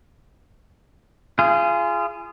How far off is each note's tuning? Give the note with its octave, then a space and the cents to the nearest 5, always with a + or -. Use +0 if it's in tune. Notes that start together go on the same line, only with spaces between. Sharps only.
F4 -30 G#4 +0